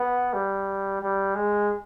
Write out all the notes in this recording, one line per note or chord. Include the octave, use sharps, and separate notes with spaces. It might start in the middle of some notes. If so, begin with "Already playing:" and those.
Already playing: B3
G3
G3
G#3